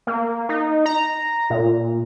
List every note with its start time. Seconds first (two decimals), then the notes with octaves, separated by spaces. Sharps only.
0.07 A#3
0.49 D#4
0.86 A#5
1.50 A#2